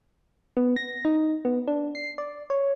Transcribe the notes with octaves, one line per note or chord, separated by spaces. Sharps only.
B3
A#6
D#4
B3
D4
C7
D5
C#5